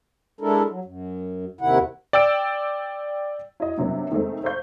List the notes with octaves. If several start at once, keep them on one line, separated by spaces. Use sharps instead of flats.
G#3 D4 E4 A4 A#4
F#3
F#2
D#2 C3 D#3 E4 F#5
D5 G5 E6 D7
E4 F#4 D#5
G2 C3 F#3 A#3 B3
D#3 G#3 A3 C4
C5 E5 F5 C#6 G6